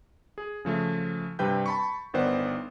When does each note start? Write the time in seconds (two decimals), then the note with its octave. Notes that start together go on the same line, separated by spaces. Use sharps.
0.38 G#4
0.65 C#3 F3 A3
1.39 G2 C3 G3 B4 G5 G6
1.66 A5 B5 C#6
2.14 G1 D#3 B3 C5 D5 F#5